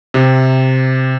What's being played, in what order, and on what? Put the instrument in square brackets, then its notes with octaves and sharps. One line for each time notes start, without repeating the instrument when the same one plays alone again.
[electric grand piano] C3